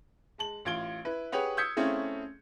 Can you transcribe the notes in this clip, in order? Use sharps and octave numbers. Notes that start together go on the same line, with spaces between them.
G#3 A5 F#7
A1 F4 G#6 D7 G7
E4 B4
G4 G#4 B4 C#5 F#5
D#6 E6 G6 G#6 B6 C#7
A3 C4 C#4 E4 G#4 F5